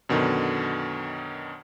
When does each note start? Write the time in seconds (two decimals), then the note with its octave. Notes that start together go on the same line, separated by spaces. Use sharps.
0.09 F#2 B2 D3 D#3